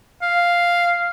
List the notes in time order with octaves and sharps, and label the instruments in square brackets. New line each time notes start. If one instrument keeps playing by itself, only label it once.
[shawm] F5